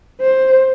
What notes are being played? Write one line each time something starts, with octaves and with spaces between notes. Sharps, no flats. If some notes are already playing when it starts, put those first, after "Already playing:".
C5